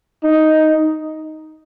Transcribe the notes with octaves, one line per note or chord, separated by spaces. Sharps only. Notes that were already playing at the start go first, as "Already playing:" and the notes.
D#4